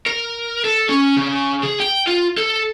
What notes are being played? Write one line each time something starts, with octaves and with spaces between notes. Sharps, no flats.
A#4
A4
C#4
C#3
G#4
G5
F4
A4